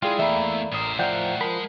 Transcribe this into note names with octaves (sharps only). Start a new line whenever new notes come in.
G#3 E4 F4 G#4 D5 G5 C7
E2 A3 A#3 E4 D5 E5 A#5 B5
A1 A2 A#4 C5 D#6
F3 A#4 D5 E5 F#5 G5 G6
F3 G#3 A#4 A5 B5